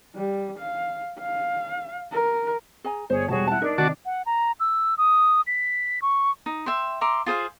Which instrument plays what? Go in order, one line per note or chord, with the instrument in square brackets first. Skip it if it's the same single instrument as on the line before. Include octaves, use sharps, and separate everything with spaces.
[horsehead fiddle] G3
F5
F5
A#4
[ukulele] G#4 G#5 A#5
[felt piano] G1 [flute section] G#4 C#5 [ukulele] C5
[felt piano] E1 G3 [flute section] F#4 G#4 [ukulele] C#5 A5
[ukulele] E4 A5 [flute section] F#5 F#6
[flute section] D4 [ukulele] D#4 [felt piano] A#4
[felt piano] C3 D#3 [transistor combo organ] F#4 D5 A5
[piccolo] F#5
A#5
E6
D#6
B6
C#6
[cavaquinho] D#4
E5 G5 C6
E5 A#5 C6 D6
F4 G#4 C5 F5